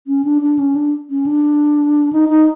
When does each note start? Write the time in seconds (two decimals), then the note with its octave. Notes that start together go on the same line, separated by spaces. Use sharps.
0.07 C#4
0.25 D4
0.42 D4
0.59 C#4
0.75 D4
1.10 C#4
1.26 D4
2.13 D#4
2.29 D#4